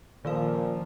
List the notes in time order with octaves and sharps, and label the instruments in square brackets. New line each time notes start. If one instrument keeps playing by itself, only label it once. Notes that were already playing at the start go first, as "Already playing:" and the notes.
[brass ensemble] A#2 [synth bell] D#3 F4 F5 [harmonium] F3